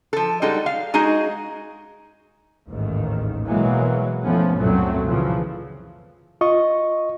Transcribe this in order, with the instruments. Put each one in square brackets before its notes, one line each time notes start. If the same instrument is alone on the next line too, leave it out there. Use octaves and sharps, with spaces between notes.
[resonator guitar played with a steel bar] F3 A4
G3 G#3 D#4 F#4 A4
F5
G#3 D#4 F#4 G#4
[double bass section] A1 D#2 G#2 D#3
B2 E3 F#3 G#3 A#3
F2 A2 F3 A3 B3 C#4
C#2 F#2 A#2 F#3 A3 C4
A#2 C#3 E3 F3
[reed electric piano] F4 D#5 C#6